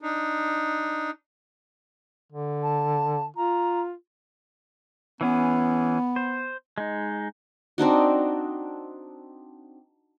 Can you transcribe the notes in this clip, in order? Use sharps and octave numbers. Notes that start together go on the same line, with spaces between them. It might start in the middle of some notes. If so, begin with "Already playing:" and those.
D4 D#4
D3
A5
F4 A#5
E3 B3 C#4 G#4
C5
G#3 D#4
C4 D4 D#4 F#4